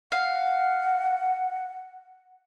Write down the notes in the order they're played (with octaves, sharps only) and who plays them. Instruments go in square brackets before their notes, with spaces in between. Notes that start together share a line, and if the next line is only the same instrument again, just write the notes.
[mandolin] F5 [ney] F#5